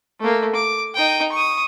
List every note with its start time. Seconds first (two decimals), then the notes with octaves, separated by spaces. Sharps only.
0.20 A3 A#3
0.55 D6
0.95 D#4 G5
1.33 C#6 D#6